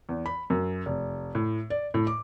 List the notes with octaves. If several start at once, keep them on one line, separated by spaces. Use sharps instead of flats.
E2
B5
F#2
F1
A2
D5
A2
D6